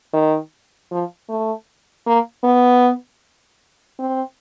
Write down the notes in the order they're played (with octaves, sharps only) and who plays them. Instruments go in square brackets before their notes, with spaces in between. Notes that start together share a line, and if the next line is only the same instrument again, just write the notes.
[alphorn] D#3
F3
A3
A#3
B3
C4